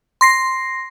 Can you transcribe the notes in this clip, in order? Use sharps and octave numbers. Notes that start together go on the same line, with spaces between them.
C6 A#6 C7